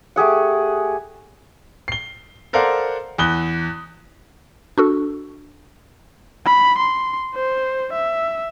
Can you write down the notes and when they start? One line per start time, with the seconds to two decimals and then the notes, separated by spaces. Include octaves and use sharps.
0.16 A3 G4 G#4 F#5
1.88 C7 G7
2.53 A4 A#4 C5 D5 F5 F#5
3.18 E2 B5 D#6 F#6 G7
4.78 D4 F#4 A4
6.46 B5
6.78 C6
7.35 C5
7.93 E5